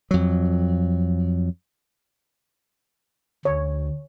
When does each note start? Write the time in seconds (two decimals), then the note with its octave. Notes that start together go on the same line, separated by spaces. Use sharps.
0.11 F2 F#3
3.45 D2 C#5